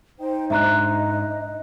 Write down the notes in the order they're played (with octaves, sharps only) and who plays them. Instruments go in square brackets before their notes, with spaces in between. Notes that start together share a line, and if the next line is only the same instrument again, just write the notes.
[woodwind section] D#4 [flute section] C5 G5
[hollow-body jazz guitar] G#2 D4 C5 [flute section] D#5 [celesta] E5 A#5 F#6